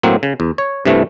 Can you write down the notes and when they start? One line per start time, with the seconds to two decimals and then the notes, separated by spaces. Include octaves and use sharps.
0.03 A2 F#3 A#3 C4
0.23 C#3
0.40 E2
0.58 C#5
0.85 G2 C3 E3 A3